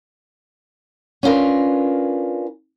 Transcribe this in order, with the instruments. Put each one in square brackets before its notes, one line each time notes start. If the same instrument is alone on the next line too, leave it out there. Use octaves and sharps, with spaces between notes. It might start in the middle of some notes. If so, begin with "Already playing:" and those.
[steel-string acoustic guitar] C#4 D4 F4 A#4 B4